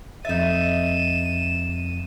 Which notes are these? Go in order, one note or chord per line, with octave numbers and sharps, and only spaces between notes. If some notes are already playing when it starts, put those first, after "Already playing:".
F2 D#4 E5 A6 D#7 E7